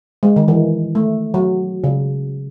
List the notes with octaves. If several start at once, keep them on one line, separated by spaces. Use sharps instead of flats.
G#3
D#3
E3
A3
F#3
C#3